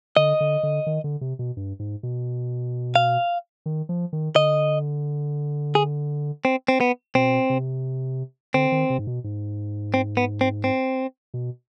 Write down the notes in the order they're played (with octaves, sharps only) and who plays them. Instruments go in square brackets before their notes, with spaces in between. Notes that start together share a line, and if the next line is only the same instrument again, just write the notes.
[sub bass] D3 [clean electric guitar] D#5
[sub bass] D3
D3
D#3
D3
C3
B2
G2
G#2
B2
[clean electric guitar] F5
[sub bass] D#3
F3
D#3
[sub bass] D3 [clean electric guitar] D#5
[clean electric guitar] G#4
C4
C4
B3
[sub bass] B2 [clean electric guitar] C4
[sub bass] C3
[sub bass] D3 [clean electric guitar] C4
[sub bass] D#3
C3
G#2
B2
G#2
[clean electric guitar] C4
B3
C4
C4
[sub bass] B2